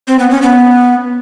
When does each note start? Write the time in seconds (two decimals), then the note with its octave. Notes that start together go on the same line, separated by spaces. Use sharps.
0.08 C4
0.19 B3
0.31 C#4
0.42 B3